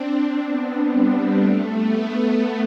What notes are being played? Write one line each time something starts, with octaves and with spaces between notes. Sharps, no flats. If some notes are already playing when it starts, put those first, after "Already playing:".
Already playing: C4 D4
C4
B3
G3
A3
B3
A3